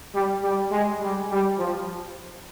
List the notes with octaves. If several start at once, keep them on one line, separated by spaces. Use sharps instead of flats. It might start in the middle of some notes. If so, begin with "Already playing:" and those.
G3
G3
G#3
G3
G3
F3